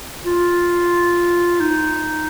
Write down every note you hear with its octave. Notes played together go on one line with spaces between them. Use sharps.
F4
D#4